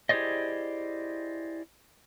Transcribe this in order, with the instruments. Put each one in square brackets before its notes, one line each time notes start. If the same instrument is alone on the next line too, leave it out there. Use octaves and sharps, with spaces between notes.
[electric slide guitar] E4 G4 G#4 C5 D5 D#5